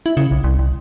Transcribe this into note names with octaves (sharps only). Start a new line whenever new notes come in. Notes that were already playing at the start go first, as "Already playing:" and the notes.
E4
C#3
B1
C2
C2